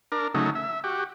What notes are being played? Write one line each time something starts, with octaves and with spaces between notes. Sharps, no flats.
D4 A#4
C#3 F#3 A3 D#4
E5
F#4 G4